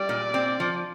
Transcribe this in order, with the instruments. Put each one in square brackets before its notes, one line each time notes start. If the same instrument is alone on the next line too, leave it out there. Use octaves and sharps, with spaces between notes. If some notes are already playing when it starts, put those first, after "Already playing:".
Already playing: [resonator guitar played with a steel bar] G3 [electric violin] D5
[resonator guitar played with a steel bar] A#2
C4
F3